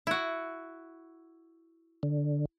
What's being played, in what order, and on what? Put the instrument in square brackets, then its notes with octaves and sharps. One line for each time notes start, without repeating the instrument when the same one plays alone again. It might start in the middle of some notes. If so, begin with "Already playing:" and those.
[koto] E4 F#4
[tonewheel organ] D3